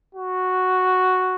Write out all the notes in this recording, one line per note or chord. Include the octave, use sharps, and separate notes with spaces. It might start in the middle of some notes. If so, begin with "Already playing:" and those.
F#4